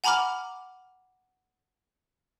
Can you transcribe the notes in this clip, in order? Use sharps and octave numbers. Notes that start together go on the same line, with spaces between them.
F#5 G#5 A#5 B5 D6 F6